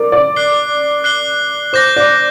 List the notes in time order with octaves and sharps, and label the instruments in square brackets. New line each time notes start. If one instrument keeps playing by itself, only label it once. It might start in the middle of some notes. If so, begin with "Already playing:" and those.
Already playing: [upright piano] A#4 D5
D5
[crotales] F#6 C7 G7
F#6 C7 G7
[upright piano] C5 [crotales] D6 G6 A#6
[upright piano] D5